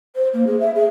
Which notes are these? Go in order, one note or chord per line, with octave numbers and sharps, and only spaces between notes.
C5
A#3
G#4
E5
G#4